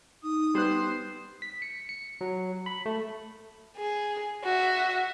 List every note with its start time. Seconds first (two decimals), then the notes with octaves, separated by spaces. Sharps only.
0.23 D#4 D#6
0.55 G3 B3 C5 F#6
1.42 B6
1.62 C#7
1.89 C#7
2.21 F#3
2.66 B5
2.86 A3
3.76 G#4
4.44 F#4 E5